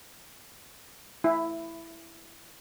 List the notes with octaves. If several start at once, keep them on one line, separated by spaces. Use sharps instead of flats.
E4